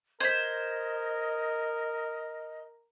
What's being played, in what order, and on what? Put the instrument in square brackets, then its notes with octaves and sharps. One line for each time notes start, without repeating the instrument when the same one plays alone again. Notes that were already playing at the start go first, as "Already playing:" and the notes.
[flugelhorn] A#4 [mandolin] C5 [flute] D#5 [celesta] G#6 B6